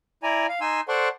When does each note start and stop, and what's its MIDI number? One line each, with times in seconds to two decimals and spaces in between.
0.23 0.47 64
0.23 0.47 74
0.23 0.47 80
0.23 0.47 82
0.49 0.60 77
0.61 0.81 63
0.61 0.81 80
0.61 0.81 84
0.61 0.81 88
0.88 1.09 69
0.88 1.09 72
0.88 1.09 74
0.88 1.09 78
0.88 1.09 84
0.88 1.09 85